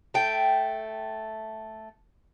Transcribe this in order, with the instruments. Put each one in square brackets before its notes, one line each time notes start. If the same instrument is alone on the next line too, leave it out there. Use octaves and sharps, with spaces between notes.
[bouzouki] A3 G5